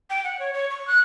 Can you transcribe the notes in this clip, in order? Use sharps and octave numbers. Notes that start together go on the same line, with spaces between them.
G5
F#5
C#5
C#5
C#6
F#6